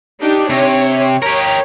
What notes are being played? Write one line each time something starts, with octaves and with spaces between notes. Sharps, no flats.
D4 D#4 G4
C3 C#5
G4 A#4 C#5